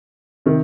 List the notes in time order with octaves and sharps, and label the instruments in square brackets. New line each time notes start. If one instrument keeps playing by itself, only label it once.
[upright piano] C3 D#3